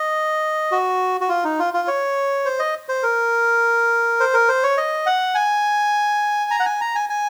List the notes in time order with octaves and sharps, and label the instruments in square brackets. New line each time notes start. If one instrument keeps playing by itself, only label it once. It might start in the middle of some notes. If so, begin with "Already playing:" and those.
Already playing: [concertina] D#5
F#4
F#4
F4
D#4
F4
F4
C#5
C5
D#5
C5
A#4
C5
A#4
C5
C#5
D#5
F#5
G#5
A#5
F#5
G#5
A#5
G#5
G#5